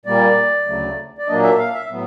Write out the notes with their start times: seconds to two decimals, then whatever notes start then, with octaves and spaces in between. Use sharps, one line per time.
0.06 A#2 G3 A#3 D5
0.67 D2 C#3 F#3 A3
1.18 D5
1.28 A#2 F#3 A#3 D4 D#5
1.43 E5
1.59 F5
1.74 E5
1.89 A2 F#3 B3